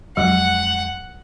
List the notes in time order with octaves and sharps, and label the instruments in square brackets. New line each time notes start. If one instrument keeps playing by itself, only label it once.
[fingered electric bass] F2 G#3 [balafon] F#3 [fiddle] F#5